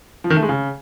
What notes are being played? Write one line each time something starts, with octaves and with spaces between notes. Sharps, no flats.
F3
D#3
A3
G#3
C#3